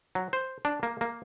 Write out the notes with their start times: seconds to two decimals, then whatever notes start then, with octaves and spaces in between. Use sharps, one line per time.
0.15 F#3
0.33 C5
0.65 D4
0.83 A#3
1.01 A#3